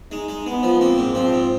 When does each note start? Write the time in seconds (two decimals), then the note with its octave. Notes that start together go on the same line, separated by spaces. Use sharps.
0.12 G#3 D#4
0.29 G#3
0.46 G#3 B3
0.63 F3
0.81 A#3 C4
0.98 G#2
1.15 F3 C4
1.33 G#2